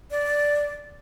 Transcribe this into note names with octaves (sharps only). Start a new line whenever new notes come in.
D5